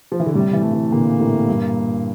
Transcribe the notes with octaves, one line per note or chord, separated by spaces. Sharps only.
F3
E3
D3
A2 C3 G3
C3 E3
A3
C3 E3
A#2 D3 A#3
A2 C3
G2 A#2